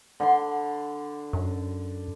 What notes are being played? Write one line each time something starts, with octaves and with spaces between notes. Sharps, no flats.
D3 B5 C6
F#2